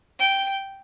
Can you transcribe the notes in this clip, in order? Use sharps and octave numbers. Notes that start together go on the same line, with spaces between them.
G5